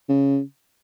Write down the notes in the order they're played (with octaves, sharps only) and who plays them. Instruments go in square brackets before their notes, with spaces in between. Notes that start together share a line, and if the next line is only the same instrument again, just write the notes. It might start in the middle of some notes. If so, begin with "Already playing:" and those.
[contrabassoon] C#3